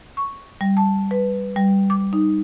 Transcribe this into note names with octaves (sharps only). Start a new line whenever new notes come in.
C#6
G3
A5
B4
G3
D6
D#4